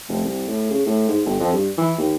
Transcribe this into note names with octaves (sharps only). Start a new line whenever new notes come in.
F1
C2
A2
C#3
A2
G#2
G1
F2
G2
E3
D#2